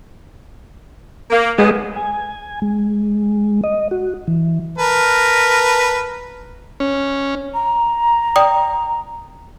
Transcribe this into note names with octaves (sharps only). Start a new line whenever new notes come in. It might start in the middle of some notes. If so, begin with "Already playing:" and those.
A#3
G#2 F#3 G#3 B3 G#4
G#5
G#3
D#5
F#4
E3
A#4 B4 A5
C#4
A#5
D5 G5 D#6